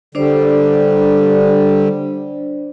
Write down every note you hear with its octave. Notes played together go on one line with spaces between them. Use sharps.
D3 G3 D4 C5 D5